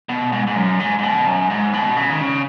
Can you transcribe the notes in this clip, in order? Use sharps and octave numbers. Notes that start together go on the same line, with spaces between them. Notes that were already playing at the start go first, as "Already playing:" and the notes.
B2
G#2
G#2
F#2
G#2
G#2
B2
F#2
G#2
B2
C#3
D#3
C#3